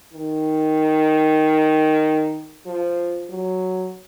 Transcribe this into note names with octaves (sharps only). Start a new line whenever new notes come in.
D#3
F3
F#3